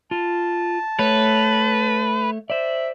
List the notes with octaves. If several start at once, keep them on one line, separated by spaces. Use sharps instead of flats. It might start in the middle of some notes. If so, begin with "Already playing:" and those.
F4 A5
A3 B4 C#5
C5 D5 E5